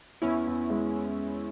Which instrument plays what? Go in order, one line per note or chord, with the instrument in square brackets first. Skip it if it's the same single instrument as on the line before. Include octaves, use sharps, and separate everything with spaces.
[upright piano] E2 [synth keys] C#4 E4
[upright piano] E2
G#3